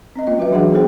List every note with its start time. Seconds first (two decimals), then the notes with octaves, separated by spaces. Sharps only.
0.15 C4 C#4 D#5
0.27 A#3 F4 D#5
0.38 F#3 F#4 B4 E5
0.50 E3 F#3 D4 F#4 G#4 F#5
0.72 B3 D#4 G#4 A4 C5 G5